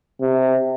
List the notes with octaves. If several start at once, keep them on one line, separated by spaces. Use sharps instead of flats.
C3